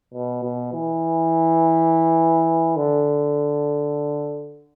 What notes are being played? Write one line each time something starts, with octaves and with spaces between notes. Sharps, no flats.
B2
B2
E3
D3